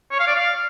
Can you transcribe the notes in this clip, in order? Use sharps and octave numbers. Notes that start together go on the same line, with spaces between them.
C#5
F5
D5
F5